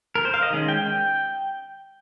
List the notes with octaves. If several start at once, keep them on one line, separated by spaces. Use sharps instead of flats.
A#4
C5
F5
D#5
D#3 G#3 C#4
G5
G5